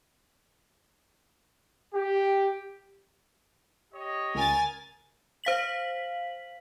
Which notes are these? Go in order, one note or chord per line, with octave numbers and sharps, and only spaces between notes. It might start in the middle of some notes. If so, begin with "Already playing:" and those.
G4
G4 C#5 D#5
C#2 A#4 G#5 A6
C5 F5 B6 F#7